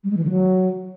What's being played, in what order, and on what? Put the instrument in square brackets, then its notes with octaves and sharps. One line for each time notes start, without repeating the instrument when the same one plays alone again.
[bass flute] G3
G#3
E3
D3
F#3